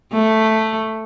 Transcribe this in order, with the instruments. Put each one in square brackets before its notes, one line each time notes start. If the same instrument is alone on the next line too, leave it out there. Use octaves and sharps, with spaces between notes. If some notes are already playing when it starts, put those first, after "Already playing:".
[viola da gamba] A3